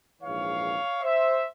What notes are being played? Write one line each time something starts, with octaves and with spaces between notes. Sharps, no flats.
A#1 G#2 E3 C#5 F5
C5 E5